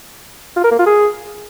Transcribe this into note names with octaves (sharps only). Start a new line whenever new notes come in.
F4
A#4
A#3
F4
G#4